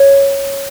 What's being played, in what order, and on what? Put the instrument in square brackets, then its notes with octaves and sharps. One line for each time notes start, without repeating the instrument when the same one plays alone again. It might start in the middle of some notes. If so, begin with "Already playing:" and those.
Already playing: [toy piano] C#5